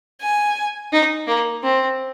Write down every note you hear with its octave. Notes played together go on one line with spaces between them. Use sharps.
G#5
D#4
A#3
C4